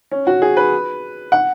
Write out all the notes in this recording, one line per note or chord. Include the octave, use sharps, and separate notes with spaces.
C#4
F#4
G#4
B4
F#5